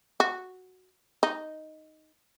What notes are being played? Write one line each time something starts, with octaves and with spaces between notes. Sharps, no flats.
F#4
D#4